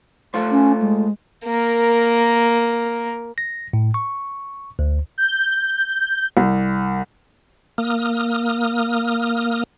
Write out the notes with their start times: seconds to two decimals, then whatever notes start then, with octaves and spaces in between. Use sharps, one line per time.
0.34 A3 F4 C5
0.51 C#4
0.81 G#3
1.45 A#3 A#4
3.38 A#6
3.73 A2
3.94 C#6
4.79 D2
5.18 G6
6.37 C2
7.78 A#3 D#6 F6